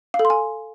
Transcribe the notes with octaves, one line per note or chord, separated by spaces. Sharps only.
F5
A4
C6
G#5